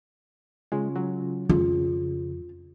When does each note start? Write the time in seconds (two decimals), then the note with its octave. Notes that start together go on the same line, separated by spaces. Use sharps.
0.72 C#3 G#3 C#4 F4
0.96 F#3
1.49 F2 C#3 F4